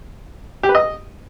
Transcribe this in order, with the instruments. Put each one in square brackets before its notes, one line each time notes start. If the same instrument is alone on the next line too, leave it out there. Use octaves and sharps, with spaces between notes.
[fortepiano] G4
B4
D#5